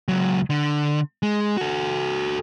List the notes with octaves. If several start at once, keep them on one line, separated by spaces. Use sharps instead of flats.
C#2 F#3
D3
G#3
F#4 A4